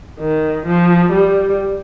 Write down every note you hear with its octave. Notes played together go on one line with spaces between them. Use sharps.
D#3
F3
G3